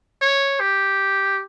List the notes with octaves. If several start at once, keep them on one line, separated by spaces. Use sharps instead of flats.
C#5
G4